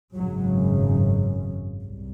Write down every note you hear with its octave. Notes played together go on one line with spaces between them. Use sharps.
G#1 F#2 C#3 F#3
C2